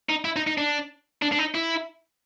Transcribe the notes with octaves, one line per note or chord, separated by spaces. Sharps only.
D#4
E4
D#4
D#4
D4
D4
D4
D#4
E4